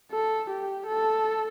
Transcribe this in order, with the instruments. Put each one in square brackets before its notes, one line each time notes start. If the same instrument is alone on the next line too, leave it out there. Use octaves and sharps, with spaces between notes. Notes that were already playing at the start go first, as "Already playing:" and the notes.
[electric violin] A4
G4
A4